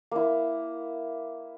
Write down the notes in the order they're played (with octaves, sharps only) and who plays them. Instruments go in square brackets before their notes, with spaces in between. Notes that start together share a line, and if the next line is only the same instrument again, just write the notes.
[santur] A#3 E4